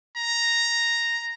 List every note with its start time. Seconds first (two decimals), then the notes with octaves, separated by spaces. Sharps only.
0.16 A#5